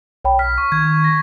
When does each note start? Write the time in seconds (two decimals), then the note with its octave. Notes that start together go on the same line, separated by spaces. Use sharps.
0.24 B1 C#5 G5 B5
0.39 F6 B6
0.58 C#6
0.72 D#3 G#6
1.04 A#6